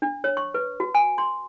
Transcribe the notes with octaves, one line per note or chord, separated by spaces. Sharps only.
D4
C#5
C#6
B4
F#4
G#5
C6